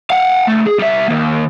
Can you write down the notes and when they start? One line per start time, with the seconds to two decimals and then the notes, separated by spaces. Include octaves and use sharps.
0.10 F5 F#5
0.47 C#2 A3
0.66 G#4
0.79 G3 E5
1.08 D#3 A#3